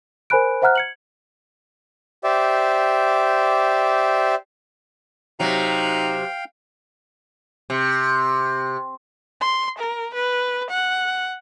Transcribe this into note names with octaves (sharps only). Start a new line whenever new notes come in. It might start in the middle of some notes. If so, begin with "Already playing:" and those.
A#4 C5 G#5 B5 F#6 D7
C5 E5 F#5 A#5 F6 F#6
G#6 C#7 F#7
G4 C5 D5 E5
C3 F#3 D#4 F5 G5
C3
C6
A#4
B4
F#5